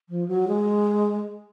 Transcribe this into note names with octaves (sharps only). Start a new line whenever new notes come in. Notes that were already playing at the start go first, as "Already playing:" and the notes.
F3
F#3
G#3